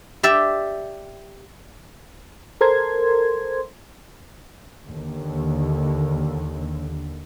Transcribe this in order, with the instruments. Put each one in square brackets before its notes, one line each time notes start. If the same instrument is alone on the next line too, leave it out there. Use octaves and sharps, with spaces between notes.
[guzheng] G4 D5 E5
[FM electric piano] A4 A#4 C5 C6 G#6
[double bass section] D#2 D3